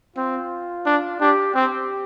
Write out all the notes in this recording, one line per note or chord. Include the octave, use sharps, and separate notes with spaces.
C4 F4
D4
D4 G4
C4 G4